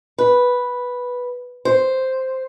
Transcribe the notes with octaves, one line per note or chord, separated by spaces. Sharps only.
B4
C5